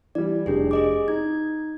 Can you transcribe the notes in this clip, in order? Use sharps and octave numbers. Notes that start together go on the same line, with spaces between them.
E3 G3 D5
F1 D4 G4 G#4
G#4 D#5 D6
D#4 G#6